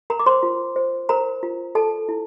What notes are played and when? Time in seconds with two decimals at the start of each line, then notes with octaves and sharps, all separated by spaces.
0.10 A#4 A#5
0.19 D6
0.26 C5 C6
0.43 F4
0.76 C5
1.09 A#4 C5 A#5
1.43 F4
1.75 A4 A5
2.09 E4